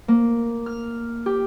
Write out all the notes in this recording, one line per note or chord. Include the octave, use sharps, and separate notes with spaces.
A#3
F6
G4